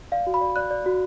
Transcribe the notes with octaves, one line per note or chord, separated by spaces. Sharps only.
D5 F5
F#4
B5
D5
D5 F#6
D5
F#4